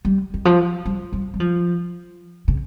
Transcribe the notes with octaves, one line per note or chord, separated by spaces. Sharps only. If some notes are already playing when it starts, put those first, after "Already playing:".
G3
D#3
F3
G3
G3
G3
F3
C#3